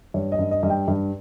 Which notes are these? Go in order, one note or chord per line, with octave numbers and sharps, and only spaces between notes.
G2 C#5
D#5
G2
D#5
G2
G5
G2